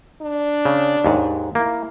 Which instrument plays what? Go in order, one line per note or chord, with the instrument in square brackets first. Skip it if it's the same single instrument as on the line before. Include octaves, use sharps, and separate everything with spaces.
[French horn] D4
[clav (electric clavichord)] C#3
D#2 G#2
[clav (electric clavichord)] A#3 [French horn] E4